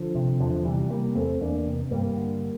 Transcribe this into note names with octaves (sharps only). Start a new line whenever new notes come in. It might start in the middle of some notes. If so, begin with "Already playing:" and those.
Already playing: D3 F3
C3
E2 D3 F3
C3 E3 G3
C3 G3 A#3
E2 A3 C4
E2 A#3 D4
C3
G2 G3 A#3
D3